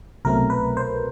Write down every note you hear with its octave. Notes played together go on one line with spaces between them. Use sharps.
C2 B2 F#3 A3 C4 A#4
B4
C5